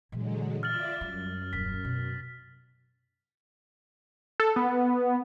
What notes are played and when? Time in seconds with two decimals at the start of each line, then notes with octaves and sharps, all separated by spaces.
0.12 A#2 D3 E3 F#3 G#3
0.63 F4 D5 E5 F6 A6 F#7
1.01 F#2 G3
1.53 D#1 B6
1.84 B2
4.40 A4
4.56 B3